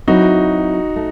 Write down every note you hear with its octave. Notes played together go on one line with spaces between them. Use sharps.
F#3 C4 D#4 E4 F#4 B4
A3